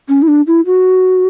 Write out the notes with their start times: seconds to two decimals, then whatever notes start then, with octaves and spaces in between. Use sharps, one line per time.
0.09 C#4
0.22 E4
0.28 D4
0.47 E4
0.66 F#4